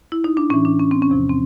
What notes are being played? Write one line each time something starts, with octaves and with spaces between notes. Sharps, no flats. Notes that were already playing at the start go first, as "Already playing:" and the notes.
E4
D#4
D4
A2 E3 C#4
D4
C#4
C4
C#4
E2 C3 F3
C4